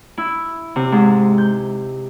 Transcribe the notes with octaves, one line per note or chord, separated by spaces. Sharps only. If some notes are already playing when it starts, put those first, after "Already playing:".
E4
C3
G#2
G6